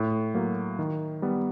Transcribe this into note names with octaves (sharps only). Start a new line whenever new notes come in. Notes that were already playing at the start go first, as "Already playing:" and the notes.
Already playing: A2
F#3 A#3
D#3
G3 B3